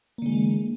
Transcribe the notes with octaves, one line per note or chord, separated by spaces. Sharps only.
D3 E3 G#3 A#3